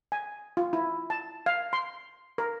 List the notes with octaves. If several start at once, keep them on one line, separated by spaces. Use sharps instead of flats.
G#5
F4
E4
A5
F5
C6
A#4